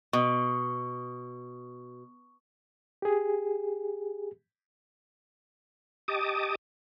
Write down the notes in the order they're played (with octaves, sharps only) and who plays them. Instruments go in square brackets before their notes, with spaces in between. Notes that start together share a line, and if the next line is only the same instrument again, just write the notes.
[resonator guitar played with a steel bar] B2 [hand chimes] C#6
[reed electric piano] G4 G#4
[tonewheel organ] G4 D#5 A5 D6 D#6